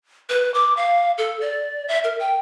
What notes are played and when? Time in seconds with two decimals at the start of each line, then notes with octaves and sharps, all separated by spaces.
0.29 B4
0.54 D6
0.77 F5
1.18 A4
1.41 D5
1.88 E5
2.04 A#4
2.20 G5